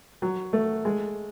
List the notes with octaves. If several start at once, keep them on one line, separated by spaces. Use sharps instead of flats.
F#3
A3
G#3